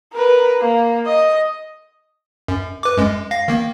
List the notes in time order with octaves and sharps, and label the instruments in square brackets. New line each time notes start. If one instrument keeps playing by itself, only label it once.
[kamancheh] A#4 B4
A#3
D#5
[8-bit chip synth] F#2
B4 D6
F#2 G#3
F5 A#6
D#3 A#3